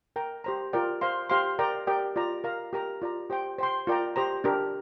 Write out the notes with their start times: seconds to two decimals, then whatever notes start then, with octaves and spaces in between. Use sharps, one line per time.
0.16 A#4 G5 A#5
0.44 G4 C5 A#5
0.73 F4 A#4 D5 G5
1.01 C5 F5 C6
1.30 G4 C5 F5 C6
1.59 A#4 D5 G5 A#5
1.87 G4 A#4 D5 G5
2.16 F4 D5 A#5
2.44 A#4 F5 A#5
2.73 G4 A#4 G5 A#5
3.02 F4 D5 A#5
3.30 G4 C5 G5
3.58 C5 G5 C6
3.87 F4 A#4 D5 G5 A#5
4.16 G4 C5 A#5
4.44 D4 G4 A#4